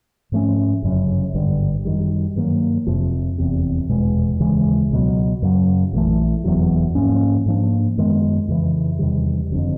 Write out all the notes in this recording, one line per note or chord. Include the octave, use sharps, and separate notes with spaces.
G#2 F3 A3 C#4
G1 F#2 C#3
G#1 G2 D3 G3
F#2 D#3 G3
G2 D#3 F#3 A#3
F1 F2 C3 F3
F1 E2 C3
F1 E2 B2 G#3
D#2 C#3 E3 G#3
C#2 B2 F#3
F#2 C#3 F#3
A#1 A2 E3 A3
F1 E2 C#3 F#3
G#2 F3 A#3 C#4
G#2 F3 A#3 D4
F#2 D#3 G#3 B3
F2 C#3 E3
E2 C3 D#3 G3
F#1 F2 D3